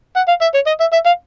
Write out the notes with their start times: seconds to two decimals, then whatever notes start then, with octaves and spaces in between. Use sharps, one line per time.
0.16 F#5
0.28 F5
0.41 E5
0.54 C#5
0.67 D#5
0.80 E5
0.92 E5
1.06 F5